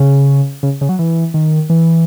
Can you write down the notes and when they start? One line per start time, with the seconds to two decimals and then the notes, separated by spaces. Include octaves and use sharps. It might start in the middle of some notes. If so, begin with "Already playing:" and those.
Already playing: C#3
0.63 C#3
0.81 C#3
0.89 F#3
0.99 E3
1.34 D#3
1.70 E3